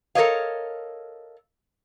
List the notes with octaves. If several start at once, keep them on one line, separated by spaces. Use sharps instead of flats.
A4 A#4 C5 C#5 D#5 F5